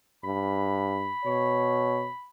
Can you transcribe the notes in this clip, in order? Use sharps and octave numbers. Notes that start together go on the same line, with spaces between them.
G2 B5
B2 C#5